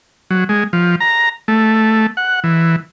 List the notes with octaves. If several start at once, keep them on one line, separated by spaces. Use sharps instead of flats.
F#3
G#3
F3
A#5
A3
F#5
E3